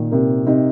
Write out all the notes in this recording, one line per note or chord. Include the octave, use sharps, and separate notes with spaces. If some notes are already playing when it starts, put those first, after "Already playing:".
Already playing: A#2 D#3
C3 A#4
C3 D#4